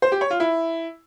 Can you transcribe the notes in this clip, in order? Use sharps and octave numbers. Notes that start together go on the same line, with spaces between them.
C5
G4
C#5
F4
E4